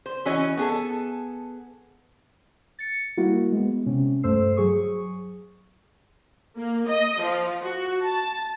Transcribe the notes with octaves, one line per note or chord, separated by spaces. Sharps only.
C5
E3 C#4 F#4 C#5 D#5
B3 G#4 A4
A6 C#7
G3 A#3 E4 F#4
G#3 B3
C3 C#4
G2 A3 C5 E6 C7
F#3 G#4 C#6 D#6
A#3
D#5
F3
F#4
A5